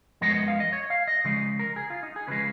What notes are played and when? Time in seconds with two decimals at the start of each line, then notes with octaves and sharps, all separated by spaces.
0.21 F#2 F3 G#3 B3 D#5
0.30 C#5
0.35 D#5
0.48 F5
0.60 D#5
0.73 C#5
0.90 F5
1.07 D#5
1.25 C#3 F3 G#3 D#5
1.59 A#4
1.76 G#4
1.90 F4
2.03 D#4
2.16 G#4
2.28 C#3 F3 G#3 B4